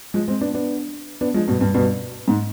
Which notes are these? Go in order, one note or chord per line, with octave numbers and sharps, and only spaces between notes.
F3 G#3
G#3 C4
B3 D4
B3 D4
B3 D4
F3 G#3
G2 B2
G2
G2 B2
G#2